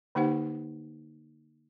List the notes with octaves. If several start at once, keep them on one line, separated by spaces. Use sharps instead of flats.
D3 A#3 D#4 G4 C5 F#5